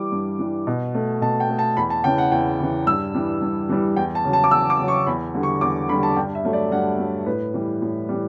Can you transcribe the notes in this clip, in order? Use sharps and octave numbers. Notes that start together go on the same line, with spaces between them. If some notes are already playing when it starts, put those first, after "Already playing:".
Already playing: E3 G3 D6
G2
E3 G3
B2
A3
B2 A5
G5
A3
A5
E2 B5
A5
C#3 E3 G5
F#5
E2 G5
C#3 E3
G2 E6
E3 G3
G2
E3 G3
E2 G5
A5
C#3 F#3
A5
D6
E2 E6
D6
C#3 F#3
C#6
E2 B5
D3 G3
C#6
E2 D6
D3 G3 B5
A5
G2 G5
E5
F#3 A3
D5
G2 F#5
F#3 A3
A2 B4
E3 G3
A2
E3 G3